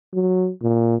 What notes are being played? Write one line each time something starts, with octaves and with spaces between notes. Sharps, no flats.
F#3
A#2